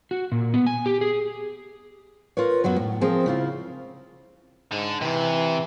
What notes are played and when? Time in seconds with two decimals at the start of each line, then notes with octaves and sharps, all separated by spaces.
0.11 F#4
0.32 A#2
0.54 B3
0.66 G#5
0.86 G4
1.01 G#4
2.37 F4 A#4 B4 C#5
2.64 F#2 F#3 B3 F#4
2.76 A2
3.01 F3 C4 G#4 A#4 A5
3.26 C#3 E4 F4
4.72 G#2 D3
5.01 C3 E3